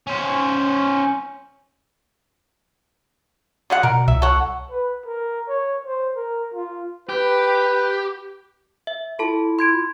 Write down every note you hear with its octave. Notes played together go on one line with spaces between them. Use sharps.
C#4 C5
D3 G#3 F#5
B2 A#4
C2 E5
A4 C#5 F#5
B4
A#4
C#5
C5
A#4
F4
G4 B4
E5
E4 F4 A4 A5
C6 G#6 D7